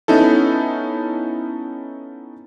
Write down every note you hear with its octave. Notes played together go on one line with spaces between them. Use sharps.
B3 C#4 D#4 E4 A4